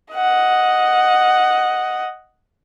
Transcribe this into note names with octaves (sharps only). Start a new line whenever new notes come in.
D#5 F#5